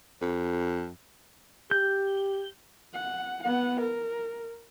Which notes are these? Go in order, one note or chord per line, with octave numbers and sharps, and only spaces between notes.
F2
G4 G6
F#5
B3 F#5
A#4